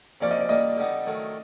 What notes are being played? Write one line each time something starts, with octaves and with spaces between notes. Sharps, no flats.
C3 F3 A#3 C#4 D5
D#5
D5
A#2 G3 A#3 D4 D#5
D3 G3 B3 D#4
D#3 F#3 A3